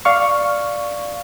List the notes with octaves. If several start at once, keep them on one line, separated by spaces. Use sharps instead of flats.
D5 F5 C#6